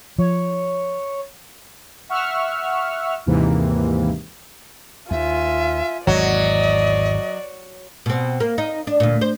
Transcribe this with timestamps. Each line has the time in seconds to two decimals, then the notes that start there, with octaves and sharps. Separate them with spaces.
0.18 F3 C#5
2.09 E5 F#5 C#6 E6 F6
3.26 D#2 G#2 C3 E3 A#3
5.11 D#2 F4 E5 G#5
6.07 G#1 E2 F#3 D5 D#5
8.06 B2 C4
8.40 A#3
8.58 D#4
8.87 D4
9.00 D2 A#2
9.21 C5